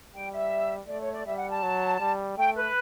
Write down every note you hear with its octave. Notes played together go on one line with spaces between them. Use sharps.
G3 G5
E5
A3 D5
C#5
D5
G3 E5
F#5
A5
F#3
G3
A3 G5
B4